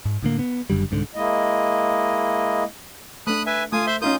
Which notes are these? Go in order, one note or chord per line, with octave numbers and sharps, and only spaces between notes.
G#2
A2 D3 A#3
B3
F#1 F#2 D3 G3
C2 G#2 D3
G#3 A#3 E4 D#5
A3 D4 B5 D#6 F#6
B4 E5 G#5
A3 F4 G#5 D#6
C5 E5 C6
C#4 D#4 F4 A#4 D#6 G6